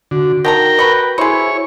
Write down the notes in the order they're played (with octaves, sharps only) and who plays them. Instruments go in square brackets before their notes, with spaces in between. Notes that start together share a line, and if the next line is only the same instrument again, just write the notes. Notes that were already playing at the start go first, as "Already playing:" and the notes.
[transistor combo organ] D3 [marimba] F#4
[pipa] D#3 G#4 A#5 [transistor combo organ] A#4 G5 [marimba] F#5 A5
[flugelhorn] B4 [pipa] B5 C#6
[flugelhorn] E4 [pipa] G#4 C5 [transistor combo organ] C#5